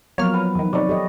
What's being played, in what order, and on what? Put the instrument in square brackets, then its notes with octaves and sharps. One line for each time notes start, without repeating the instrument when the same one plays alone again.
[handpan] F3 F#3 B3 [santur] A#3 [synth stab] C#5 F6
[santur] B4 A#5
[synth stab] E2 D#3
[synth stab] C3 D#3 [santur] C#5 D5
[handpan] G4 A4 D#5